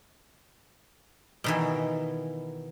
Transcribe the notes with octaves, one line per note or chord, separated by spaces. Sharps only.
B2 D#3 E3